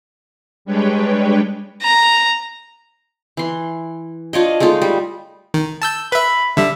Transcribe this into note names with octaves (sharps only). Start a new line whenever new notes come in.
G3 G#3 D4 B4 C#5 G5
A#5
E3 C6
D4 F4 C#5 D#5
G#3 A3 D#4 F4
G3
D#3
A5 E6 G6
B4 E5 B5
D3 G3 E5